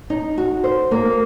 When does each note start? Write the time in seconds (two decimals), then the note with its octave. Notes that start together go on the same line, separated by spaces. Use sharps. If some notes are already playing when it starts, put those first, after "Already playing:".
0.10 D#4
0.38 F#4
0.64 C5
0.91 A#3